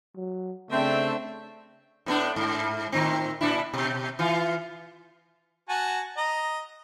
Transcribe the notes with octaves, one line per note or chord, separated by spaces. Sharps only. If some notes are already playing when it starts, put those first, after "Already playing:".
F#3
C#3 A3 C4 D4 E5
A2 B3 D4
G#2
A2 D#3 C4
A#2 D4 E4
B2
E3 F4
F#4 G#5 A5
D#5 A#5